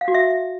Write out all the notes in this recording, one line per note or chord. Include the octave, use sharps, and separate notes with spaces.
F5
F#4
E5